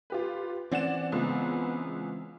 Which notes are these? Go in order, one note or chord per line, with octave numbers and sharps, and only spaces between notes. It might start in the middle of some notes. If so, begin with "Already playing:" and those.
F4 G4 B4
E3 C4 C#4 D5 F#5 E7
C#2 G#3 B3